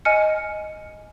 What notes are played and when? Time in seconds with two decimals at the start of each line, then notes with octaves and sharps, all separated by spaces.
0.05 D#5 G#5 F6 C#7